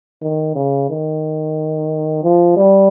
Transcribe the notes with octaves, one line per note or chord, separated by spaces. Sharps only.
D#3
C#3
D#3
F3
G3